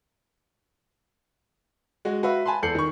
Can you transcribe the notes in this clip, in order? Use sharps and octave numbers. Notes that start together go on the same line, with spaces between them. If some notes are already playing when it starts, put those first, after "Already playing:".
G#3 F#4
F#4 B4 E5 F5
G#5 A5 B5 C6
E2 A4 G6 C7 C#7 F#7
D#3 C#6